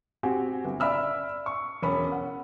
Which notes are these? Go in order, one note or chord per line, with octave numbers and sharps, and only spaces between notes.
C4 F#4 G4 G#5
G1
D5 E5 B5 E6 F6
C#6
E1 C#4 B5
F#5